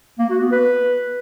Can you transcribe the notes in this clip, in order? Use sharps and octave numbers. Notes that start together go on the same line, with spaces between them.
A#3
F#4
B3
B4